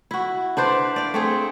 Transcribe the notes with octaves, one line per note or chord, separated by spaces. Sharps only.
E4 F#4
D4 B4 C5 D5
D5 F5
A3 C4 G#4